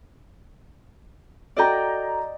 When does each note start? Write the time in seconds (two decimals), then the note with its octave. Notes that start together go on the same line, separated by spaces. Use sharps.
1.56 F#4 A4 D5 D#5 G5 A#5